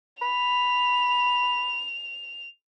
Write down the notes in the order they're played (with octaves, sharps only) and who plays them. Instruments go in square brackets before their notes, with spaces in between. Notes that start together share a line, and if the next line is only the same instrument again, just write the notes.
[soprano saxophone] B5 [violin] F7